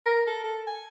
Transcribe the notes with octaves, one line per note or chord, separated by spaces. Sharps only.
A#4
A4
A4
G#5